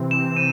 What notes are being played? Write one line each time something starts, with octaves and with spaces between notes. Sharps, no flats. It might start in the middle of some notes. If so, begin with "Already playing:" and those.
Already playing: C3 E3 C4
E7
D#7